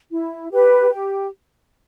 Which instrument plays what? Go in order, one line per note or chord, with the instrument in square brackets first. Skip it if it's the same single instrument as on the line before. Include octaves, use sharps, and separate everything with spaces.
[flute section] E4
G4 B4
G4